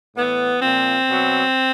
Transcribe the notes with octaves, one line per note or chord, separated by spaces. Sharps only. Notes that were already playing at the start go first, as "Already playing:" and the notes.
A2 E3 B3
A#2 F3 C4
B2 F#3